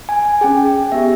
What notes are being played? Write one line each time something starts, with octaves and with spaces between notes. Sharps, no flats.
G#5
G#5
C#4 G#4 G5
B3 G4 E5